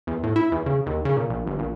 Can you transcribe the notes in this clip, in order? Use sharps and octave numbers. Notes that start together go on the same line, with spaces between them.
E2
A2
E4
E2
C#3
D#2
C#3
A#2
A#1
G1
A#1